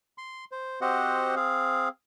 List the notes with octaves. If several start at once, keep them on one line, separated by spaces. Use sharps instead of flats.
C6
C5
C4 F#4 G4 C5 D#5 F#5
C4 G#4 F5